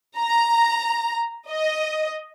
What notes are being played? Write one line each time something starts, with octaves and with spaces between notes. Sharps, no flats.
A#5
D#5